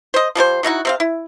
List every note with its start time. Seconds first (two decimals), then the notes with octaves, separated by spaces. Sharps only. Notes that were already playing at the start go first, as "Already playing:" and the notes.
0.14 C5 D#5
0.35 F3 G3 F4 C5
0.63 F#3 D#4 E4 F#4
0.85 C3 C4 F5
1.00 E4